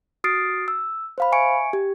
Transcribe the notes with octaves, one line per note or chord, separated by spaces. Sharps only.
F#4 D#6 F6 A6 C7 D7
E6
C5 F5 B5
E5 G#5 C#6 C#7 D7
G4